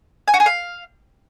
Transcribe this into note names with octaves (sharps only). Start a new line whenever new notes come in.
G#5
F#4
G#4
F5